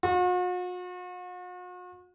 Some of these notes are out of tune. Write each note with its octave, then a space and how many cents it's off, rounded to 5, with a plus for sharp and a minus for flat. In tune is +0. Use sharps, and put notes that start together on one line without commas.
F#4 -45